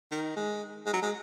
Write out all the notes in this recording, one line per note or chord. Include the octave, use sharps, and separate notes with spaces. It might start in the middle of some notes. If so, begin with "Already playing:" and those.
D#3
G#3
G#3
F#3
G#3